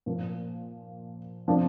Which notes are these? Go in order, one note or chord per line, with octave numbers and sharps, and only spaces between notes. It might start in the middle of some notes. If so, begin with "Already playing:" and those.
A#2 F3 A#3
C3 F3 A#3 D4